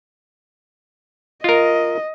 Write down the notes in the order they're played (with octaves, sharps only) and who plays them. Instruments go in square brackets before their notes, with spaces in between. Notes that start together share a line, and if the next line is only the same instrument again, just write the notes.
[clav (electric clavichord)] F4 A#4 [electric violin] D#5